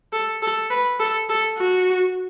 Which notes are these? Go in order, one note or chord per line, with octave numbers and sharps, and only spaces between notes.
A4
A4
B4
A4
A4
F#4